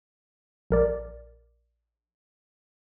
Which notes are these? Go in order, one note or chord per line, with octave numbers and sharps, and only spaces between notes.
A#1 A#4 D5